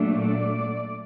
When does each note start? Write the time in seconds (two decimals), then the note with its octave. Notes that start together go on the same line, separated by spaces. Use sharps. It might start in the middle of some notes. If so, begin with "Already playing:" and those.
Already playing: A#2 F#3 A3 D4
0.16 D5